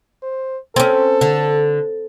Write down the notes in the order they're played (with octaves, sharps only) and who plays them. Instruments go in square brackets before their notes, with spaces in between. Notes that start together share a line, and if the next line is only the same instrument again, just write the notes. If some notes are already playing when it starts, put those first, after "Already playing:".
[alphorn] C5
[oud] C4 C#4 [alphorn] A4
[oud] D3